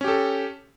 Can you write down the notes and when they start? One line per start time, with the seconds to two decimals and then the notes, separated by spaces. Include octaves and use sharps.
0.01 C#4
0.04 G4
0.08 A4